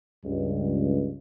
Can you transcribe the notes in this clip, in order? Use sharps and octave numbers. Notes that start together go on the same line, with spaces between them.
C#2 G2